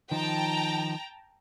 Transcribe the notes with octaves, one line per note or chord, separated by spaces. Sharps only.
D#3 F3 D#4 G5 A5 A#5